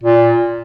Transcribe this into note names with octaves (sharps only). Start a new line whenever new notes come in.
A#2